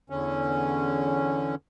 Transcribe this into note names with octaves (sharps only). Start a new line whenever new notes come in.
E2 D3 C#4